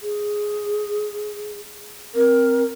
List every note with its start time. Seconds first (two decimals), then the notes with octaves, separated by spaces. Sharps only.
0.02 G#4
2.15 C4 A#4